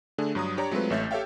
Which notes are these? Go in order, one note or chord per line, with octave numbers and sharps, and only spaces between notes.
D3 A3 D4 G#4
G2 F#3 A#5 D#6
D4 G4 C#5 D5 A#5
F#3 G#3 A3 C4 F4 B4
A1 A3 C#5 E5 G6 A6
G4 A4 C#5 E5 F5 G5